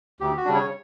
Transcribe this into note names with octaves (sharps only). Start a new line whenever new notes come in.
D2 G4
F#4
C#3 G3 D4
C#5